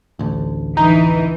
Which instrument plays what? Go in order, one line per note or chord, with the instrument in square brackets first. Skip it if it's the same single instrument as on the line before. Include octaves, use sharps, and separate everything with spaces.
[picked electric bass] A1 D2
[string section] E3 [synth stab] D#4